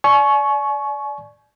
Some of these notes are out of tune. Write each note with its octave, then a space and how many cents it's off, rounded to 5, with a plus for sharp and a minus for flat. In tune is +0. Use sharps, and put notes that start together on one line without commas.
D5 +0 G#5 +40 C#6 +0